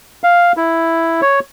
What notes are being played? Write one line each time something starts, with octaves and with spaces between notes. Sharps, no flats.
F5
E4
C#5